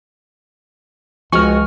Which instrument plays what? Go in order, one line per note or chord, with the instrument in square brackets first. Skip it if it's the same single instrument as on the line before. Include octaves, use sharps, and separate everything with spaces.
[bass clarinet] C#2 [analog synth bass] F3 [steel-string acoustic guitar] G#3 F#4 G#5 [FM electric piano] C#6 F6